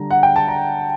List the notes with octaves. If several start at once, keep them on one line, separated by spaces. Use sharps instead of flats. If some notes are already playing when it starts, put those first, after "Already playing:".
Already playing: D3 G3 D4 A#5
F#5
G5
A5
A#5